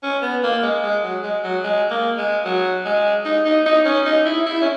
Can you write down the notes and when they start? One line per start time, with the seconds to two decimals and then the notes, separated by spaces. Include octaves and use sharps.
0.03 C#4
0.22 B3
0.43 A#3
0.63 G#3
0.83 G#3
1.04 F#3
1.23 G#3
1.44 F#3
1.64 G#3
1.91 A#3
2.18 G#3
2.45 F#3
2.85 G#3
3.25 D#4
3.45 D#4
3.65 D#4
3.85 C#4
4.06 D#4
4.25 E4
4.46 E4
4.62 C#4